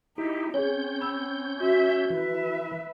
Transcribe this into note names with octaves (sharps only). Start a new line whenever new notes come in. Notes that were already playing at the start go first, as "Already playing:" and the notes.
D#4 E4 G4
C4 C#4 G#4 C#5 G6
B5 E6
F#4 E5
E3 B4 E5